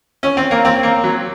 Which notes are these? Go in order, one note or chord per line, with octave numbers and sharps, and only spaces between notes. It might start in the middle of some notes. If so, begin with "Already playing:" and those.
C#4
C4
A#3
C4
A#3
F#3